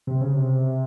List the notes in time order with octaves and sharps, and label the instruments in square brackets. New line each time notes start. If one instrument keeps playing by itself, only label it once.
[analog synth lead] C3
C#3
C3